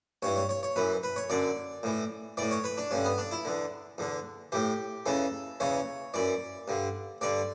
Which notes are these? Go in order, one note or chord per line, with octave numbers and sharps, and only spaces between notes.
G2 E3 C#5
C#5
C#5
C#5
F#2 E3 B4
B4
C#5
F#2 D3 D5
A2 E3
A2 E3 D5
C#5
B4
D4
G2 D3 C#4
B3
D4
E4
E2 D3
E2 D3
A2 E3 G4
E2 C#3 E3 A4
E2 C#3 E3 C#5
F#2 E3 D5
G2 D3
G2 D3 D5